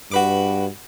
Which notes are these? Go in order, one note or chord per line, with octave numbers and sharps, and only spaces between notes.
G2 F#4 B4 D6